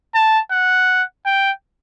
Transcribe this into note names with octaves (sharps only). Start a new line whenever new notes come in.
A5
F#5
G5